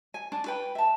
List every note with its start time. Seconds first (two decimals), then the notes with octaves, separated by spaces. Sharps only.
0.14 G#5
0.32 D4
0.46 B4 G5 B5
0.75 E5 A5